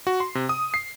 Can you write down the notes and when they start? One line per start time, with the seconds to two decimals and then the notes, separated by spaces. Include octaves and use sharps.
0.07 F#4
0.20 C6
0.35 C3
0.49 D#6
0.74 C7